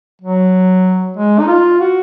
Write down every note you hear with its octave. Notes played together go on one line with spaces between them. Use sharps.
F#3
G#3
D#4
F4
F#4